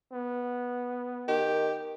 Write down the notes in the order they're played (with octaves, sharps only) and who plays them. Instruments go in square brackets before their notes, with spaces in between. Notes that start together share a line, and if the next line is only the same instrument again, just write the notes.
[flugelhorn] B3
[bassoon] D#3 [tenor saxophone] G4